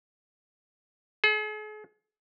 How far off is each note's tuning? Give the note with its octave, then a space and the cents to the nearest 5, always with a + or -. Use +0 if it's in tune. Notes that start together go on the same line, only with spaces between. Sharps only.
G#4 +45